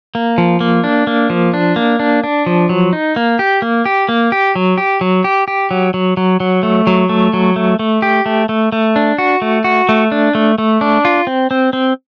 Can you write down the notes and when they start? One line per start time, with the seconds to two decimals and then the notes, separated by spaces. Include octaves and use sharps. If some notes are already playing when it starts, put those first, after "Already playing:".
0.15 A#3
0.38 F3
0.61 A#3
0.84 D4
1.07 A#3
1.30 F3
1.54 D4
1.76 A#3
1.99 D4
2.24 D4
2.46 F3
2.69 F#3
2.93 D#4
3.16 A#3
3.39 G4
3.62 A#3
3.86 G4
4.09 A#3
4.32 G4
4.56 F#3
4.78 G4
5.01 F#3
5.24 G4
5.48 G4
5.71 F#3
5.94 F#3
6.17 F#3
6.40 F#3
6.63 A3
6.87 F#3
7.09 A3
7.33 F#3
7.56 A3
7.79 A3
8.02 G4
8.26 A3
8.49 A3
8.72 A3
8.96 D4
9.18 F#4
9.42 A3
9.64 F#4
9.89 A3
10.12 D4
10.35 A3
10.58 A3
10.81 D4
11.05 F4
11.27 C4
11.51 C4
11.73 C4